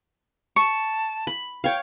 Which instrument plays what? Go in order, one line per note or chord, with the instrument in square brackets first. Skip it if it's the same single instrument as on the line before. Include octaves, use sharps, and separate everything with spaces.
[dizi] A5 [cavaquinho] C#6
[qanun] B5
[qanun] C#5 F5 [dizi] G5